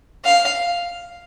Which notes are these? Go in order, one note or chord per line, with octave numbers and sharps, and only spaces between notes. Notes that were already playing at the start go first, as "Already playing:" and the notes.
F5